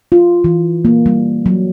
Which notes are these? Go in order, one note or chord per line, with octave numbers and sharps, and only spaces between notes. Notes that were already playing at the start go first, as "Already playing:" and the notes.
F4
E3
A#3
G3
F#3